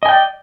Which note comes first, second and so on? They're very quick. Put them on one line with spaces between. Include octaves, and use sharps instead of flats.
D#5 G#5 G5 D5